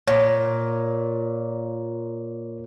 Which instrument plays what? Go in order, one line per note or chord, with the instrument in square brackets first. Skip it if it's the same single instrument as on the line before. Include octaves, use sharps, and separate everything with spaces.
[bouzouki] A#2 [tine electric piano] C#5